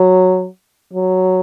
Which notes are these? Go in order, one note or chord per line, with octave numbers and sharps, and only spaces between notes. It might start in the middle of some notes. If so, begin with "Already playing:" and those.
Already playing: F#3
F#3